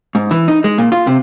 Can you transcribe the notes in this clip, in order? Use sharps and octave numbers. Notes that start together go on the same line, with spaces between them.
G#2
E3
D#4
G#3
A#2
F4
C3